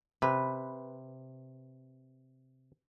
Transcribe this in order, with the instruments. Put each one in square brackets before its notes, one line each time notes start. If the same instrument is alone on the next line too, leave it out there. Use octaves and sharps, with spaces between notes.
[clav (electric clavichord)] C3 [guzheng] B4